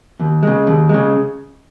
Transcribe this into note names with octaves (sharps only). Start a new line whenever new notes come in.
D#2
C#3 G#3
D#2
C#3 G#3